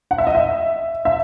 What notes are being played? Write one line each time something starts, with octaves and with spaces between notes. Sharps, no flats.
F#5
E5
D#5
E5
E5